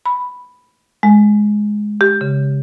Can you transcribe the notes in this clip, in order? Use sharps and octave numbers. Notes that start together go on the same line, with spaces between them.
B5
G#3
G4
C#3